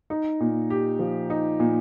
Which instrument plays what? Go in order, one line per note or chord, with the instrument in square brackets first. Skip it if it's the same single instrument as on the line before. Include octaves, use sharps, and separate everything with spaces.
[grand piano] D#4
A#2
G4
F3
D#4
A#2